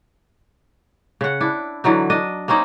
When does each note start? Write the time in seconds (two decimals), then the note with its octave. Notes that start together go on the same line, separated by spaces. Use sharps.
1.21 C#3 F#5
1.41 D4 E4
1.84 D3 E3 F#3 D#4
2.10 D4 D#5
2.48 A#3 C4 C#4 D#4